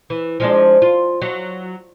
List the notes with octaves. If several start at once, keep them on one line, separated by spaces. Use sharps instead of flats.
E3
F3 G#3 D4
F4
F#3